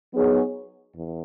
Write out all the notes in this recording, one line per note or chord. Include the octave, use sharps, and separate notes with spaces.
F#3 B3 D#4 G#4 C#5
E2